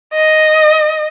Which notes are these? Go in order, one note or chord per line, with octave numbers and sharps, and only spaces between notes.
D#5